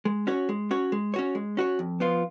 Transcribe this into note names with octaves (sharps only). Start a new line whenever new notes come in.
G#3
C#4 F#4 C#5
G#3
C#4 F#4 C#5
G#3
C#4 F#4 C#5
G#3
C#4 F#4 C#5
F2
F3 B3 F4